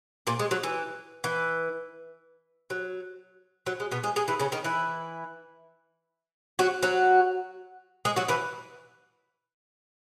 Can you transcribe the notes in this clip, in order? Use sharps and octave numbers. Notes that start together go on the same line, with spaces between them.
A#2 A#3
G#3
F#3
E3
E3
F#3
F#3
G#3
B2 B3
G#3 G#4
G#3 G#4
E3 E4
C#3 C#4
D#3 D#4
E3 E4
F#3 F#4
F#3 F#4
G#3 G#4
F#3 F#4
E3 E4